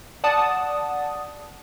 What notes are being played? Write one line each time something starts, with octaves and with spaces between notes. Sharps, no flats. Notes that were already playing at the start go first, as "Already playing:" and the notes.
D5 F#5 A5 D#6